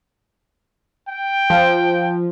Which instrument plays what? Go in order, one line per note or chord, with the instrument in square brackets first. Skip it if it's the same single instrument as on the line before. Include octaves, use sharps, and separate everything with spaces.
[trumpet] G5
[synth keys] F3